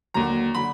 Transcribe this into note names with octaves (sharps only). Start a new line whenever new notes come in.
D#2 D3 F#3 A#5
D3 F#3 B5